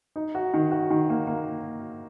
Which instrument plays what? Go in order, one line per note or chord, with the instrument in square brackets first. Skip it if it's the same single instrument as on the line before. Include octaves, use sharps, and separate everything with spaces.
[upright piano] D#4
F#4
D#3
F#4
D#3
A#3
A#3